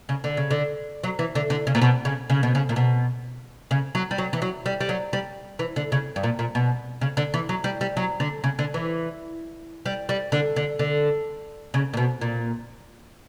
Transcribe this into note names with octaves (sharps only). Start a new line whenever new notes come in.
C#3
D3
C#3
D3
F#3
E3
D3
D3
C#3
A#2
B2
C#3
C#3
B2
C#3
A#2
B2
C#3
F#3
G3
F#3
E3
F#3
G3
G3
F#3
G3
E3
D3
C#3
G2
A#2
A#2
B2
C#3
D3
E3
F#3
G3
G3
F#3
D3
C#3
D3
E3
G3
G3
D3
D3
D3
C#3
A#2
B2
A#2